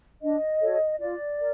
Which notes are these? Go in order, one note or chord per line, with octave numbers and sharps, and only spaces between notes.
D4 D#5
F#4 A4 C#5
F4 D5
A#4